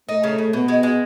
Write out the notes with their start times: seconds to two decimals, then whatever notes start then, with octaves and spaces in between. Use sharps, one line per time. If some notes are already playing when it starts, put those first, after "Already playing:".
0.09 A3 D#4
0.23 C#3
0.38 C#3
0.53 B2 B3
0.68 G#3
0.83 G#3